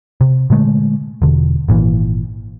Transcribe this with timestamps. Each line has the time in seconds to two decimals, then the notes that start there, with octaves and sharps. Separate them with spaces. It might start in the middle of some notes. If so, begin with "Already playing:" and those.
0.21 C3
0.50 A#2 D3 G#3 A3
1.22 E1 D3
1.68 G#1 A#2 E3